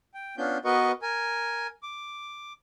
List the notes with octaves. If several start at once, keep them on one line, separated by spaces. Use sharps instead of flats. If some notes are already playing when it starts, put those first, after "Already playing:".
G5
B3 C#4 D4 F4 G6
B3 F#4 A#4 B4 D#5 C#6
A#4 G#5
D6